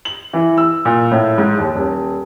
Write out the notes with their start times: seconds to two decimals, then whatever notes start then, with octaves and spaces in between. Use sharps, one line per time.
0.05 F#7
0.33 E3
0.57 E6
0.85 A#2
1.11 A2
1.38 G#2
1.58 D#2
1.75 D#1